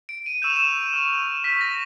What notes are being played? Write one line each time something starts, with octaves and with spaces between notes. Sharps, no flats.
D7
D#7
C#6 E6 G6 E7
F7
E7
C#6 F6
C#6 F6 B6
A#6